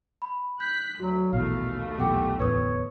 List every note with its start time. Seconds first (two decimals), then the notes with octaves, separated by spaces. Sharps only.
0.22 B5
0.60 F#6 G6 B6
1.00 D2 F#3 F#4
1.33 A#1 D#2 B2 E3 A3 F5
1.98 B1 E2 A#2 G4 A4 F#5 G5
2.40 D1 A1 E2 B4 C#5 D#6